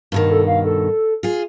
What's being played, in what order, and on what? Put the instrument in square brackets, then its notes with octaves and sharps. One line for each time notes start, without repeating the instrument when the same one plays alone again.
[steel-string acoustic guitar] G2 B2 D#3
[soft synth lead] A4
F5
A4
[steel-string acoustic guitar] F4 G#4